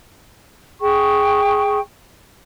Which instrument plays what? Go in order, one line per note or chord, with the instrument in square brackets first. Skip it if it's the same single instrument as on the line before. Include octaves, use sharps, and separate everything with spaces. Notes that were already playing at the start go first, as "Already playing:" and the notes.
[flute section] G#4 G5 C#6